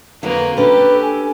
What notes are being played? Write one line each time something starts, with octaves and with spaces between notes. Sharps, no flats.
F2 D3 F#3 A#3 B4
C#4 D4 G4 A4 B4
A4 G#5